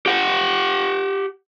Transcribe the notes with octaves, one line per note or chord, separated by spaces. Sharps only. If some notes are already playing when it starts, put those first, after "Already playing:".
G4 F#5 G5